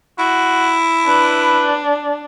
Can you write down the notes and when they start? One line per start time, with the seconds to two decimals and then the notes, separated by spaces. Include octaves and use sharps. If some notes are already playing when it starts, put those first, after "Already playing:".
0.19 E4 F#4
1.08 D4 B4